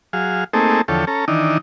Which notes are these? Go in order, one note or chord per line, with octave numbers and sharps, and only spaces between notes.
F#3 G#4 F5
A3 A#3 C4 D#4 G#4 A4
E2 D3 F3 A4 C#5 G5
C#4 A4 A#5
D#3 E3 D4 D#4